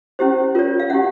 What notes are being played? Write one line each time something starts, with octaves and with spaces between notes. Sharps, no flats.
C#4 E4 G4 C5
F4 A#4 C#5
F5
C#4 E4 G4 E5 F#5